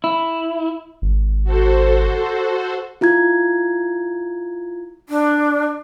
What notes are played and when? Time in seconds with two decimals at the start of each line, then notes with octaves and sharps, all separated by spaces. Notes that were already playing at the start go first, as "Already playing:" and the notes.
0.04 E4
1.02 G#1
1.44 F#4 A4 C5
3.01 E4 F4 A#5 G#6
5.09 D4